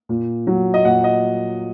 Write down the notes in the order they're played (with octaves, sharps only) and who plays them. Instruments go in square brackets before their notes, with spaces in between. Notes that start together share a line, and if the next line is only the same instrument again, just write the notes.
[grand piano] A#2
F#3
D#5
A#2 F#5
D#5